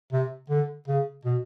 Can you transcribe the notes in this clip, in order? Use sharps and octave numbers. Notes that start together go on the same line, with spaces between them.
C3
D3
C#3
B2